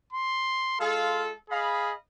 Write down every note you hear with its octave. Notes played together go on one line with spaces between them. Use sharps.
C6
G#3 F4 A4 F5
G#4 D#5 F5 B5